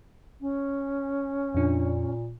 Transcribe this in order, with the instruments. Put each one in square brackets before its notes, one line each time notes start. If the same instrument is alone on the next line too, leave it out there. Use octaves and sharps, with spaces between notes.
[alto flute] C#4
[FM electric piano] F2 D4 [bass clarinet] A#2